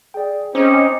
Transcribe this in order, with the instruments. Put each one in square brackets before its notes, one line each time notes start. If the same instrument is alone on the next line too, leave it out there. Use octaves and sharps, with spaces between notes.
[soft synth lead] G#4 [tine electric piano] D5 G5
[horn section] C4 D#4 [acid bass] C#4 [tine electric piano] C5 [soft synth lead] D6